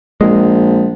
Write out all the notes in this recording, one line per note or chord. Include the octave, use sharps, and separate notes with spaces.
A#1 G#3